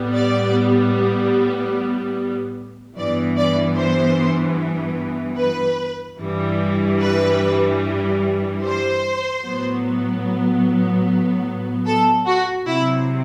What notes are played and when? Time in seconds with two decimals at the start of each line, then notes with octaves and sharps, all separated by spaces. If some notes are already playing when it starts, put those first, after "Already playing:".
Already playing: A2 G3 B3
0.14 D5
2.96 G2 E3 B3 D5
3.37 D5
3.77 C5
5.38 B4
6.19 G2 E3 G3
7.01 B4
8.62 C5
9.43 A2 F#3 B3
11.86 A4
12.26 F#4
12.67 C3 F#3 C4 E4